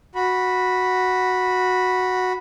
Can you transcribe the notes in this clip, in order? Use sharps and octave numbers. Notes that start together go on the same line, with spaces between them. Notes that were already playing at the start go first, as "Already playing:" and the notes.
F#4 B5